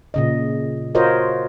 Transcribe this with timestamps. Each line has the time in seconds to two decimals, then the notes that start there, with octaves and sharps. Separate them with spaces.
0.14 A#2 C#3 D#5
0.95 F4 F#4 A#4 C5 C#5 D#5